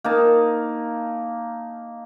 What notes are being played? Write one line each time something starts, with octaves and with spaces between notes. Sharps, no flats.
A#3 D#4 A5